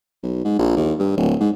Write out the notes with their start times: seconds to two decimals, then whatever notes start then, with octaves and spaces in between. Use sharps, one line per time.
0.23 B1
0.45 G#2
0.59 A#1
0.77 D#2
0.99 G2
1.17 D1
1.40 G#2